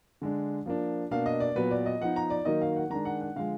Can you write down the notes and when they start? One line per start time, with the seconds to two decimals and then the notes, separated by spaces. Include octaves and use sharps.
0.22 D3 G#3 D4
0.66 F3 A#3 D4
1.11 B2 A#3 D4 F5
1.26 D#5
1.40 D5
1.55 A#2 F#3 B3 B4
1.71 D5
1.86 D#5
2.01 F3 B3 D#4 F#5
2.16 A#5
2.30 D5
2.45 D#3 F#3 A#3 D#4 D#5
2.61 F5
2.76 F#5
2.90 D#3 G#3 D4 A#5
3.05 F#5
3.21 F#5
3.36 D3 F3 G#3 F5